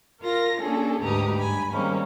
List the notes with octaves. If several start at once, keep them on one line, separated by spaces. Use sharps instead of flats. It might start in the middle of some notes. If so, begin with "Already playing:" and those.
F4 A#4 A#6
A#3 C#4 D4 G#4 A4
D2 G#2 G4 B4 A#5 D#6
G2 G#5 B5
D#3 G3 G#3 A#3 C4 C#4